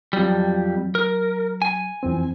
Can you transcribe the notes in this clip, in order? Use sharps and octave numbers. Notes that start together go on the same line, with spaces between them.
F2 F#3 G3
A#4
G#5
F2 E3 C4